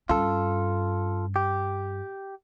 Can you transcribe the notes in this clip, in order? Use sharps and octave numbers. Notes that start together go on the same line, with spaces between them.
G2 C#4 F4 A4
G4